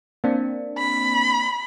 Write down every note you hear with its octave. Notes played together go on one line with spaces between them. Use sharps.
A#3 C4 D4
B5